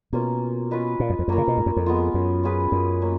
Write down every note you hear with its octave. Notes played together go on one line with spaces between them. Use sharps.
B2 A#3 C#4 F4
C#4 F4 B4 D#5
A#2
F#2
F2
F#2 A#3 C#4 F4 A#4
C#3
B2
G#2
F#2
F2
G#3 B3 F4
F#2
C#4 F4 G#4 B4
F#2
A#3 C#4